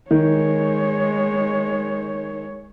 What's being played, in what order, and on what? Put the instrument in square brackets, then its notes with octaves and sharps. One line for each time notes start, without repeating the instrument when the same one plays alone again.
[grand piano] D#3 [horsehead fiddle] G#3 C#5